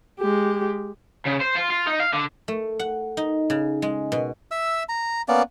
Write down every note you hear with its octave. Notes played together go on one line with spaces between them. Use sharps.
G#3 G4
C#3
C5
F4
F4
D#4
F5
D3
A3
F#5
D#4
C#3
G#3
B2
E5 E6
A#5
A#3 B3 C#4 D5